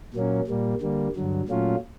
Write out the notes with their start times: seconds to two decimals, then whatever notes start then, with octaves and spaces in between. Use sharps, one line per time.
0.14 A#2 F#3 A#3 C#4
0.48 A#2 G3 A#3
0.81 D3 G3 A#3
1.15 G2 D3 F#3
1.48 A#2 F#3 A3 C#4 F4